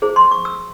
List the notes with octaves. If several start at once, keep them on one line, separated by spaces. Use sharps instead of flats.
E4 G#4 C5
C6
C#6
E6